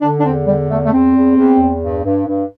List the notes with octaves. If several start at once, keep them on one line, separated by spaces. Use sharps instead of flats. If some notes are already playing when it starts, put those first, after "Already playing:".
D3 D4
D4
E2 C4
D3 G3
E2 A3
A3
E2 C4
E2
E2
E2
G2
G2
G2